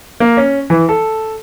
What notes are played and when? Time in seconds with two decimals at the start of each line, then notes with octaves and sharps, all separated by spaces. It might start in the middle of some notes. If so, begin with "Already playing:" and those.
0.20 A#3
0.37 C#4
0.70 E3
0.89 A4